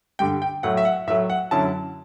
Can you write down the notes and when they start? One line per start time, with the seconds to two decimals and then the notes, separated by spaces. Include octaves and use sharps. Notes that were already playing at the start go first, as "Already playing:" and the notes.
0.19 G2 D3 G3 G5
0.42 G5
0.63 A2 F#3 A3 F#5
0.77 E5
0.85 F#5
1.07 A2 F#3 A3 E5
1.30 F#5
1.51 F#2 D3 F#3 C#4 E4 A5